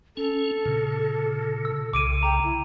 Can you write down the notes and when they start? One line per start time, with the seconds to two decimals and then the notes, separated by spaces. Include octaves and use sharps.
0.17 C#4 A4
0.65 A#2 C#3
1.65 E6
1.93 C2 C#3 D6 D7 D#7
2.23 G5 A#5
2.44 E4